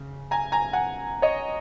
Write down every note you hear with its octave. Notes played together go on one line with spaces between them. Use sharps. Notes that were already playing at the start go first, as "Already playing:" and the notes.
Already playing: C#3
G#5 A#5
G#5 A#5
F#5 G#5
C#5 D#5